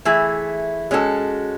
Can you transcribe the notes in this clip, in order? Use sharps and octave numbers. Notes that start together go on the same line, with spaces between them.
E3 A3 E4 G#4
G#3 C#4 F#4 A4